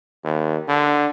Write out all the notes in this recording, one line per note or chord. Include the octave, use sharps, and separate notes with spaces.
D#2
D3